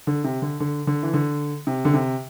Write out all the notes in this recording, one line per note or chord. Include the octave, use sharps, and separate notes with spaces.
D3
C3
D3
D3
D3
E3
D3
C3
D3
C3